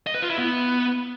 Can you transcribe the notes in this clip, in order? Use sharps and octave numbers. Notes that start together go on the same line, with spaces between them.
D#5
B4
F4
E4
B3